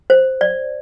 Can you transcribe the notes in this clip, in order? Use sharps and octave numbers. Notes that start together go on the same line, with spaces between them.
C5
D5